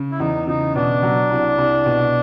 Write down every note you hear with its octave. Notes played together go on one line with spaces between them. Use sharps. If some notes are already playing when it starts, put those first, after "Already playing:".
Already playing: C#3
E4
E2 D#4
C#3 D#4
B2 D4
F#3
C2
C2
B2